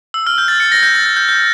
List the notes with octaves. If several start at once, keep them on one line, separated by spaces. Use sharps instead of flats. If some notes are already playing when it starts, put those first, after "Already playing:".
E6
F6
G6
A6
A6 C#7
A#6
G6
A6
G6
G6
G6